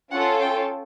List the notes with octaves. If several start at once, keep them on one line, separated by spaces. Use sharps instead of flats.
C#4 F4 A4 F#5
G5